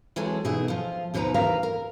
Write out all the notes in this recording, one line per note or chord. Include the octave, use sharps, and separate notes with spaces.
E3 F#3 G#3 C4 G#4 A4
B2 E3 D#4 G#4 E5
F3 F4
D#2 B2 F3 D#4 B4 A#5
D#2 E3 A#4 B4 F5 A#5
A#4